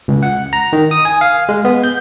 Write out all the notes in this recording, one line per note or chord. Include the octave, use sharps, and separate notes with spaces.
C#2
F#5
A#5
D#3
D#6
G#5
F5
G#3
B3
G6